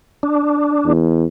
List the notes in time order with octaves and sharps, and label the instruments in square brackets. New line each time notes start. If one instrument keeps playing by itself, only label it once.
[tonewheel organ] D4
[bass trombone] E2